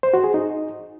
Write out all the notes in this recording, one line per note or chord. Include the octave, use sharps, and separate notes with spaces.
C5
F#4
G#4
D#4